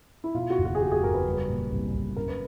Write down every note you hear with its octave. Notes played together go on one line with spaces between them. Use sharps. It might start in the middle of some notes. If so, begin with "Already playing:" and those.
E4
B2 F4
F#4
F#1
F#4
G#4
E2 G4
G#4
F#1 A#4
B4
G3
A#2
C2
C2
F#2 A#4
B4